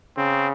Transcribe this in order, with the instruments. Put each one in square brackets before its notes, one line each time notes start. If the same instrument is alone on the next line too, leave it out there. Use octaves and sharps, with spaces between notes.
[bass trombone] C#3 [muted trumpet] C4